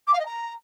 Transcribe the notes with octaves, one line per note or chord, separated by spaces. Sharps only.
D6
F5
D#5
A#5